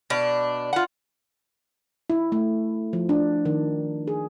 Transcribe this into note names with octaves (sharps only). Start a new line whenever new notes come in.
B2 D4
F4 F#5
E4
A3
F3
D4
D#3
G#4